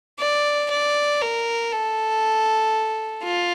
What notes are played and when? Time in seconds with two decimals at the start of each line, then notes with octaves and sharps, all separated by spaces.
0.19 D5
0.70 D5
1.21 A#4
1.72 A4
3.24 F4